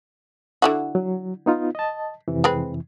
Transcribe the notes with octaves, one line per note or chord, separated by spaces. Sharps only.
D3 E4 F#4
F#3
B3 D#4 F4
D#5 A5
F2 C3 E3
G#3 C4 B4